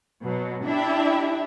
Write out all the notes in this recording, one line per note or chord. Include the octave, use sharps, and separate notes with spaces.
B2 F#3
D4 E4 G4 E5